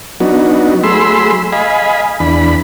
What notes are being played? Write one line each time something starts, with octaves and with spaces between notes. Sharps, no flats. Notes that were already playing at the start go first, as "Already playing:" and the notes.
F#3 B3 D4 D#4 F#4
F#3 A3 G#4 B5 C6 E6
D#5 F5 G#5 B5
E2 D4 B5